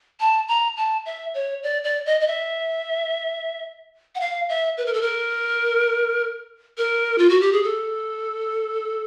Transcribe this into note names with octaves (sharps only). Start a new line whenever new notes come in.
A5
A#5
A5
E5
C#5
D5
D5
D#5
D#5
E5
F#5
F5
E5
B4
A#4
A4
A#4
A#4
F4
F#4
G4
G#4
A4